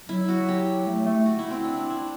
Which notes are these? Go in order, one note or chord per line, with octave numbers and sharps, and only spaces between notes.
F#3 E4
F#4
G4
A3
A3
F#4
E4
C4
D4
D4
E4